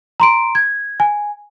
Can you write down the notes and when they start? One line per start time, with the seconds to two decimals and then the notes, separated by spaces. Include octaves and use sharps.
0.20 A#5 C6 D7
0.55 G#6
1.00 G#5